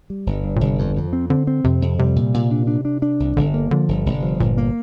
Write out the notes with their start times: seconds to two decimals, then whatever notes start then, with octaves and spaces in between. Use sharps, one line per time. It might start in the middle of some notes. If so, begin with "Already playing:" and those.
0.10 G3
0.26 G1
0.44 G2
0.56 A#2
0.61 G1 C3
0.79 F2
0.85 D3
0.96 F2
1.08 F3
1.13 C4
1.30 D3 C4
1.47 C4
1.64 F2 C3
1.82 F2
1.99 C3 G3
2.16 A#2
2.34 A#2
2.51 D4
2.67 D4
2.85 D4
3.02 D4
3.20 C2
3.37 G1 D3
3.54 A#3
3.71 D3 F3
3.88 G1
4.05 G1 C3
4.22 F3
4.40 G1 A#2
4.58 A#3